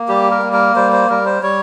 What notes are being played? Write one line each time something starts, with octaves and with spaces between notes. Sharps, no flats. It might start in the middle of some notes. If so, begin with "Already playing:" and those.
Already playing: A#3
G3 G4
A#4
A#3
A#4
G3 C5
C5
G3 A#4
C5
G3 C#5